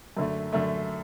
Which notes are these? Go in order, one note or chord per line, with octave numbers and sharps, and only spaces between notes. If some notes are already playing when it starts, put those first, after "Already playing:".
F#2 D3 A3
F#2 D3 A3